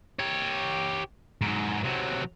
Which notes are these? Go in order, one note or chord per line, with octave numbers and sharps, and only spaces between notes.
G4 C#5
G#2 F#3
C3 F#3